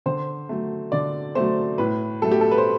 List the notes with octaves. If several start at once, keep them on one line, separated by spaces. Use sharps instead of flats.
D3 C5
F#3 A3
D3 D5
F#3 A3 C5
A2 B4
F#3 A3 A4
G4
A4
B4
C5